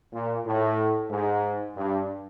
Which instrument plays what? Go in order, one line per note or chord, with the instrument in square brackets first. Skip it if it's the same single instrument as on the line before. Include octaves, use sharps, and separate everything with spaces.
[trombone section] A#2
A2
G#2
G2